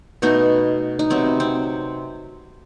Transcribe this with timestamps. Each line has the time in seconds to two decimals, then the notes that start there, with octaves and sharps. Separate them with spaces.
0.22 B2 A3 B3 D#4
0.99 D#4
1.10 C3 F#3 B3 C4
1.40 C4